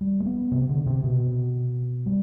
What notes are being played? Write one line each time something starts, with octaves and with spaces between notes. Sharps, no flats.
G3
A3
B3
C3
D3
C3
B2
G3